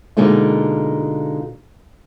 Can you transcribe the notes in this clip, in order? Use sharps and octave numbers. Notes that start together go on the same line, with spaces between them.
B2 D3 G#3 A#3 D#4 F4